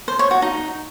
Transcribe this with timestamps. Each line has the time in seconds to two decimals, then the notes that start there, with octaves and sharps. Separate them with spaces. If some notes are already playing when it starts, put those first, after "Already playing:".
0.08 C5
0.19 C#5
0.31 F#4
0.42 D#4